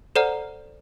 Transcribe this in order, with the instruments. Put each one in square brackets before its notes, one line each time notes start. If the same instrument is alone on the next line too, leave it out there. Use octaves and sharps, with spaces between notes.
[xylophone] A4 C5 D5 F#5 A#5 F6